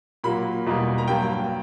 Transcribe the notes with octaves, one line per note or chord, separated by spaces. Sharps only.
A#2 F#3 A#3 B5
E2 B2 G3 A#3
A#5
G2 F#3 A#3 G5